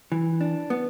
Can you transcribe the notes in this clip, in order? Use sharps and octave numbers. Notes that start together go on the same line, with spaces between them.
E3
D4
B3